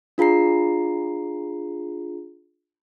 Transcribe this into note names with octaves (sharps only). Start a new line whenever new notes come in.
D4 F4 G#4 A#5 C7